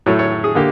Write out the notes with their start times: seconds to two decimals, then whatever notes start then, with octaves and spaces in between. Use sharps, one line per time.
0.06 A2 F#3 A3 C#5
0.19 C#5
0.44 G#4
0.55 D3 A#3 G4